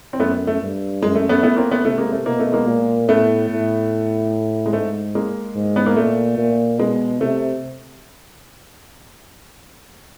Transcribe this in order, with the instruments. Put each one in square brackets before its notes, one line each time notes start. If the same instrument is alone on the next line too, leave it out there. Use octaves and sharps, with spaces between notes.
[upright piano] C4
[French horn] F#2 [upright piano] A3 B3
[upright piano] A3
[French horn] G2
[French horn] F#2 [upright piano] G#3
[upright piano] A3
A3 B3
A3 B3
A#3 C4
A3 B3
[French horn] C3 [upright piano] A3
[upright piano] G#3 A#3
A3
[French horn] B2 [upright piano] A#3
[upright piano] A3
G#3 A#3
[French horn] A#2
[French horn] A2 [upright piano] A3 B3
[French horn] A2
[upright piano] G#3
[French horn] G#2 [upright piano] A3
[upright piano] G#3 A#3
[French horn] G#2
[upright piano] B3
A#3
[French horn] A#2 [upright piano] A3
[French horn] A#2
[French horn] B2 [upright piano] G#3
[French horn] C3 [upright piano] A3